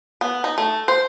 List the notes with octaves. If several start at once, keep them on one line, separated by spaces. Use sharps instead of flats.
B3
D#4
A3
C5